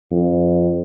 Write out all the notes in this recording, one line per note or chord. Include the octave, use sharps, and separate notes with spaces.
F2